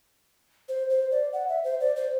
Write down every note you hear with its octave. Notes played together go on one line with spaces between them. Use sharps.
C5
C5
D5
F#5
E5
C5
D5
C5